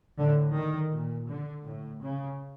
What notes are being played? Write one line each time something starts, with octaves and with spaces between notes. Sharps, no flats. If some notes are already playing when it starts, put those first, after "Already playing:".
A2 D3
D#3
A#2
D3
A2
C#3